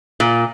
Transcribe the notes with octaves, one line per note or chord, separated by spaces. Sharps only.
A#2